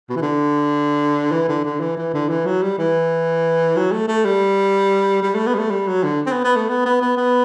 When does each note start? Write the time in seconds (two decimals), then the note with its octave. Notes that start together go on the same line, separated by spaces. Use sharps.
0.09 B2
0.16 E3
0.22 D3
1.32 E3
1.48 D3
1.64 D3
1.80 E3
1.97 E3
2.14 D3
2.29 E3
2.46 F#3
2.62 G3
2.79 E3
3.76 F#3
3.92 A3
4.08 A3
4.25 G3
5.22 G3
5.35 A3
5.47 B3
5.54 G3
5.59 A3
5.70 G3
5.88 F#3
6.04 D3
6.26 C4
6.31 B3
6.44 B3
6.56 A3
6.69 B3
6.85 B3
7.02 B3
7.17 B3